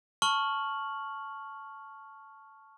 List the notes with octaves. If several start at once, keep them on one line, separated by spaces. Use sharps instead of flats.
A5 C#6 F6 F#7